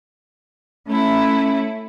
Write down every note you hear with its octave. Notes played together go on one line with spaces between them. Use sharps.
A3 C#4 E4